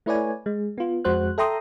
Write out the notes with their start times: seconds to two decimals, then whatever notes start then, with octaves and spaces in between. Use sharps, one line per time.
0.06 A3 E4 B4 C#5 D5 G#5
0.46 G#3
0.78 B3 F4
1.04 F2 G#3 F#4 C5 F#6
1.38 A4 E5 G5 A#5 C6 D#6